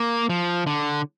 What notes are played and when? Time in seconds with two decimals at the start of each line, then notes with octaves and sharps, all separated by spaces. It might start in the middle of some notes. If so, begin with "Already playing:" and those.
Already playing: A#3
0.30 F3
0.67 D3